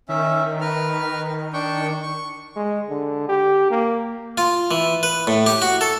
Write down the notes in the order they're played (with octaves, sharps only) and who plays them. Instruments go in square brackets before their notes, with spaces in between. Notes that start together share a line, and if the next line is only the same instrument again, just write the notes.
[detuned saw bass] D#3 [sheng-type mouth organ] C#4 E5
[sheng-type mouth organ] A#4 B4 F6
D4 G5 C#6
C#6
[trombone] G#3
D3
G4
A#3
[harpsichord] F4
E3
B4
A2
G4
F#4
A4